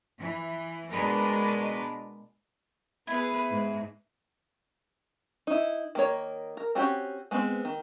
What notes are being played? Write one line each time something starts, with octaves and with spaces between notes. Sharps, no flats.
E3
B2 G#3 D4 A#4 B4
B3 E4 G#4 B4
G#2
D#4 E4
D#3 A#3 C#5
A#4
C4 C#4 F#4 G4
G#3 B3 C4
D#3